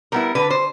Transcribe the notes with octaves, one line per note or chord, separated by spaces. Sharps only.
G3 B3 E4 A#4
D3 B4
C5